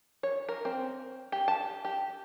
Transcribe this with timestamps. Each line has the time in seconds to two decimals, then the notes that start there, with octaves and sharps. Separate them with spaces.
0.23 C#5
0.49 A#4
0.65 C4
1.32 G4
1.48 A5
1.85 G4